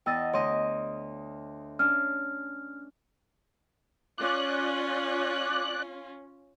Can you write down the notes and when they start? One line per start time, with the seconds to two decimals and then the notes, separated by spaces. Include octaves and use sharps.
0.06 E2 D#5 G5 E6 A6
0.33 D2 C#5 D#5 C6
1.79 C#4 D4 F6
4.18 C#4 F4 D5 F#6